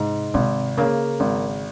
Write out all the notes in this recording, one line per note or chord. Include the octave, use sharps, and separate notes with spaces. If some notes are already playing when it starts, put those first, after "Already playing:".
Already playing: G#2 C3
G#1 C3
C#3 A#3
G#1